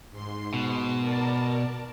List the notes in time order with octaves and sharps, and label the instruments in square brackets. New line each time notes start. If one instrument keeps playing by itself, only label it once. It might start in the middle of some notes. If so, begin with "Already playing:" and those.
[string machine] G#2 C6
[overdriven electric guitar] B2
[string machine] A#4 D5 A5